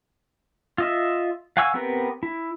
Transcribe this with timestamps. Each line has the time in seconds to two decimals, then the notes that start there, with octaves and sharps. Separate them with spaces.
0.78 F4 D#5 E5
1.57 F5 F#5 G#5 C#6 E6
1.74 B3 C4 G4 A#4 B4
2.23 E4